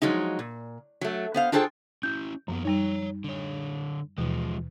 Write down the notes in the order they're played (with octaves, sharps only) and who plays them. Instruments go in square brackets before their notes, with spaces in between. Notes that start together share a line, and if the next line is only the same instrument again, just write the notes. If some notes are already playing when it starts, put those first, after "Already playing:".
[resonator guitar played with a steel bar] F3 F#3 G#3 D#4
A#2
F#3 A3
B3 C5 F5
D4 F4 G#4 A4 C5 G5
[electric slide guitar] C#4 E4 [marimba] G6
[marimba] F#2 [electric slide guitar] F3 A#3 B3
[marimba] G3 D#4 [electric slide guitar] C#5 G#5 A#5
[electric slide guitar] D3 C#5
[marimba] D#2 B2 E3 [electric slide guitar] F3 G#3